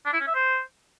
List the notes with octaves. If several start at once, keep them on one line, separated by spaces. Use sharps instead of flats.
D4
E4
C#4
E5
C5